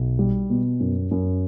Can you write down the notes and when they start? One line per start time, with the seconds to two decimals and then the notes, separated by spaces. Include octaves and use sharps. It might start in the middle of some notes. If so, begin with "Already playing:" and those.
Already playing: B1
0.19 G3
0.50 B2
0.80 F#2
1.11 F#2